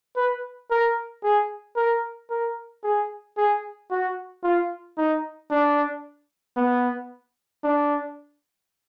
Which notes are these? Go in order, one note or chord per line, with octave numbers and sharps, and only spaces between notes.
B4
A#4
G#4
A#4
A#4
G#4
G#4
F#4
F4
D#4
D4
B3
D4